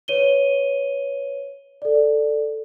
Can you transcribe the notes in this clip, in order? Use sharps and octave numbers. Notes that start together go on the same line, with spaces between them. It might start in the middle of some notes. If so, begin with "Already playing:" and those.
B4 C#5 D#7 G7
A4 D5